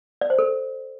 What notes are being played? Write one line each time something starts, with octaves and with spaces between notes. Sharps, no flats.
D5
C5
A4